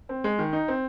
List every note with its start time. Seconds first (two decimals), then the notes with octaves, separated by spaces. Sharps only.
0.09 C4
0.24 G#3
0.39 D#3
0.53 D#4
0.68 C4